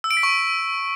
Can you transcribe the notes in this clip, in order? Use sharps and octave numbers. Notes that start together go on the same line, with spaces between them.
E6
D7
B6
C#6